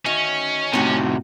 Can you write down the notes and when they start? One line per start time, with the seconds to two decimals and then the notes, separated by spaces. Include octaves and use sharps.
0.06 D2 D#3 C#4 D#4
0.73 A2 C3 D#4 F#4 G4